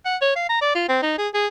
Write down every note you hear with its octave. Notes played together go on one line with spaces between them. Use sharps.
F#5
C#5
F5
A#5
D5
F4
C4
D#4
G#4
G#4